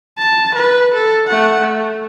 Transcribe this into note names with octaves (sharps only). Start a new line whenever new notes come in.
A5
B4
A4
A3 F#5
A3